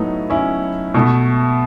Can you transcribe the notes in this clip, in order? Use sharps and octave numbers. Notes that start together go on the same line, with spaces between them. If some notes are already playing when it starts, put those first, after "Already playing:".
Already playing: A2 F#3 A3 B3 D#4
C#4 E4
B2 A3